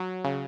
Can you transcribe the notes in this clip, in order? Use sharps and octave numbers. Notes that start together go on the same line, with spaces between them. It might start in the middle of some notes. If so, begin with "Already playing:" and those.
Already playing: F#3
C#3